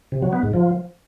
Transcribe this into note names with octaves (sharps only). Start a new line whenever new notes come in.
C3
F#3
B3
G#2
F3